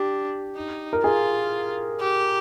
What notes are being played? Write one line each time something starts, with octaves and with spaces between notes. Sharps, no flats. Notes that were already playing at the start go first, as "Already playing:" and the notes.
Already playing: D4 G4
D#4
A#4
F4 G#4
G4